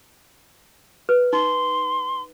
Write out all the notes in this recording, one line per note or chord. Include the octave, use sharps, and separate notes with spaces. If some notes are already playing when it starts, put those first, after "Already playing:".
B4
D#4 C6